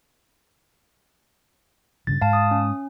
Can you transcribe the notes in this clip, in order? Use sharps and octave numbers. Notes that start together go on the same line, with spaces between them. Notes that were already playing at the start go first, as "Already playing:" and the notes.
G2 C#3 E3 A6
G#2 F5 A5
D#6
C#4